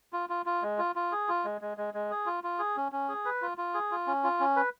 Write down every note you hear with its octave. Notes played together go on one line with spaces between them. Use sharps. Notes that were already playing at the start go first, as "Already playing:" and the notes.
F4
F4
F4
G#3
F4
F4
G#4
F4
G#3
G#3
G#3
G#3
G#4
F4
F4
G#4
C#4
C#4
G#4
B4
F4
F4
G#4
F4
C#4
F4
C#4
B4